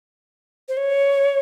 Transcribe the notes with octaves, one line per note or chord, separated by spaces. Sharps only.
C5
C#5